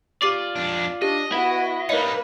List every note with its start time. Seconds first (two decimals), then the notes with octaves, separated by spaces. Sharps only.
0.22 F4 G4 D5 D6 C7
0.56 F2 D4
1.02 D4 G4 D#5
1.32 B3 E4 F#4
1.89 G3 A#3 D#4 B4 C#5 D#5 C#7